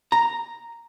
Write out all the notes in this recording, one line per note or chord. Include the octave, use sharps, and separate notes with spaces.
A#5